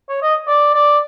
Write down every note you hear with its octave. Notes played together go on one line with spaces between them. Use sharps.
C#5
D#5
D5
D5